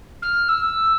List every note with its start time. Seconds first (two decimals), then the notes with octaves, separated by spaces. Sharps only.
0.22 F6
0.48 E6